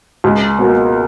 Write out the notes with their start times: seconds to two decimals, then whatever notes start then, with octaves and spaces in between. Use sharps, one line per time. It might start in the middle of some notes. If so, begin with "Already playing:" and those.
0.24 C#2
0.59 B2 A#3